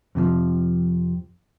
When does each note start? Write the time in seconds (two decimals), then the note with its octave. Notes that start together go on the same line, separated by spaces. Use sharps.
0.15 F2 C3 D#3 F3